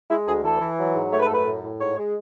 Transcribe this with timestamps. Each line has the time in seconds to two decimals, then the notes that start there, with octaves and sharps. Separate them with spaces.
0.10 G#3 E4
0.27 D2 G#4
0.44 E3 A4
0.61 E3
0.78 F#3
0.95 G#2
1.12 A3 C#5
1.20 B4
1.27 A4
1.30 F#2 B4
1.46 A2
1.63 A2
1.80 G#2 C#5
1.98 G#3